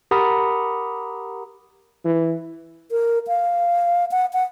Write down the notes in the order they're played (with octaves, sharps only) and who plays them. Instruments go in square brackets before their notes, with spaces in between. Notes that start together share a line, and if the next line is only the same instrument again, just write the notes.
[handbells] G4 A#4 F#5 A#5 B5 D#6
[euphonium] E3
[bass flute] A#4
F5
F#5
F#5